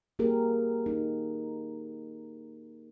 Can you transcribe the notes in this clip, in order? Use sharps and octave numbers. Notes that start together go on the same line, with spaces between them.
A#3 G4 G#4 A#4
D#4